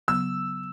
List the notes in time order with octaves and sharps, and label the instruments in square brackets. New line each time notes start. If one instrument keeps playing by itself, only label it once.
[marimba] C#3 F#3 B3 [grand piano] E6